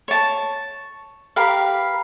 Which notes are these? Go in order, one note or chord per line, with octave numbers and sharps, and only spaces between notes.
C#5 A5
G4 A#4 B4 F5